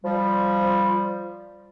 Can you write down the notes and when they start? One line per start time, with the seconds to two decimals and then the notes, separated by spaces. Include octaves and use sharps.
0.05 F3 G3